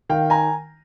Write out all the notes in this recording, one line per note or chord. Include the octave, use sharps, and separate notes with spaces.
D#3 F5 G5
G#5 A#5